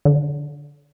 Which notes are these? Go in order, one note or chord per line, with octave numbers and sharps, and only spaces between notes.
D3